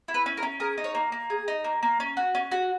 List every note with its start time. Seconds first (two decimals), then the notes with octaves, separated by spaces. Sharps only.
0.08 E4
0.14 B4
0.26 C#4
0.37 A#4
0.43 C#4
0.60 G#4 A#4
0.78 D#4
0.84 C#5
0.95 A#3
1.12 A#3
1.30 G#4
1.48 D#4
1.64 A#3
1.82 A#3
2.00 C#4
2.17 F#4
2.35 C#4
2.51 F#4